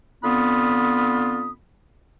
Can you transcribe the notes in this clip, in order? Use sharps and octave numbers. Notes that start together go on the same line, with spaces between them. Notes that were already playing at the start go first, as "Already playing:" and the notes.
D3 B3 C4 F4 B5 D#6